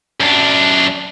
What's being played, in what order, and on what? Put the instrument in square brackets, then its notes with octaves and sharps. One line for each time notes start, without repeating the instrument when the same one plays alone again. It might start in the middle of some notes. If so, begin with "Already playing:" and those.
[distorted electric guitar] F#2 D4